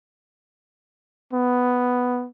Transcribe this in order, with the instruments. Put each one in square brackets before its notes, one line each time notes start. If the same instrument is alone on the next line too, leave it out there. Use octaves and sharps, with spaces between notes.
[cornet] B3